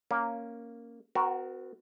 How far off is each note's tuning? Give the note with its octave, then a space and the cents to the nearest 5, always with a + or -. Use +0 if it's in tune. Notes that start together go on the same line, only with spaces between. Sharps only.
A#3 +0 C#4 +0
C4 -45 F#4 +0 A#4 +0